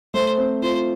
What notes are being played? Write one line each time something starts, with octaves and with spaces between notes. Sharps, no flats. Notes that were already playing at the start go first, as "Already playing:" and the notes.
A3 C5
C4
F4 C5